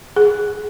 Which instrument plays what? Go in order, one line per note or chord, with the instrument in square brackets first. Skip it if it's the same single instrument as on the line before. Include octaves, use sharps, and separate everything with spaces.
[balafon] G#4